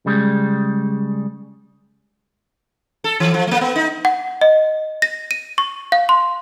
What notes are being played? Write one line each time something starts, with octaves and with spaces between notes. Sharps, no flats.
C#3 G3 G#3
A4
E3
F3
A3 A#3
B3
D#4
F#5
D#5
A#6
D#7
C#6
F5
C6